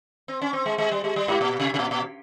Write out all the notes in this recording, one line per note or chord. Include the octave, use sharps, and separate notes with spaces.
C4
C#4
C4
G#3
G#3
G3
G#3
G3
G#2
A#2
C3
C3
A#2
A#2